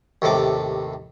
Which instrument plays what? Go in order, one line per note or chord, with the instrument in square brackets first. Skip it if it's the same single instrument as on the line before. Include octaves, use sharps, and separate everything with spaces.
[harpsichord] D#2 A2 C3 A4 D6